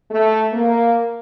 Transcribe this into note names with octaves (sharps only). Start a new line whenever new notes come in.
A3
A#3